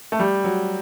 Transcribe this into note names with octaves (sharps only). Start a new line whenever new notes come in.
A3
G3
F#3